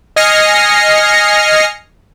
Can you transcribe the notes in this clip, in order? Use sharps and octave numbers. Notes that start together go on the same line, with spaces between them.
D#5 G#5 F6 A#6 C7 C#7